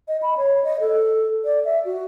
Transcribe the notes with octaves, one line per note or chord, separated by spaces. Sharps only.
D#5
B5
C#5
D#5
A4
D5
E5
F#4